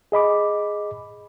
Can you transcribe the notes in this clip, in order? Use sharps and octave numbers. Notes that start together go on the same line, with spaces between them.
G#4 D#5 B5 D6